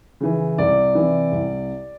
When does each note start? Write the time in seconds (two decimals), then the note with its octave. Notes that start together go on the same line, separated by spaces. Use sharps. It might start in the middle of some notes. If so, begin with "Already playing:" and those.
0.21 C#3 E3
0.58 C2 D5
0.95 C3 E3
1.32 C2